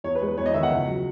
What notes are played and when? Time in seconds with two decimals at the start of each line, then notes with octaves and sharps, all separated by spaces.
0.04 E2 C#5
0.15 B4
0.21 G#3
0.27 B4
0.37 E2 C#5
0.46 D#5
0.54 D#3 E5
0.63 F#5
0.71 C#2
0.88 F#3